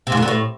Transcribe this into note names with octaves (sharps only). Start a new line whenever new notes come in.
C3
G#2
F2
D3
A2